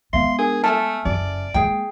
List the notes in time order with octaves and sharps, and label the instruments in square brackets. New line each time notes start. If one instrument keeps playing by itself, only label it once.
[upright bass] G#3 B3 [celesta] E5 F5 [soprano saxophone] C6
[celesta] D4 A#4 G#5 [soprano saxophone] G#4
[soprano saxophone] A3 [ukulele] A4 G#5 A5 [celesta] E5 F6
[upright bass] F#1 C#4 [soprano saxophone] D5
[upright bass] G#3 A#3 [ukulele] G#4 G5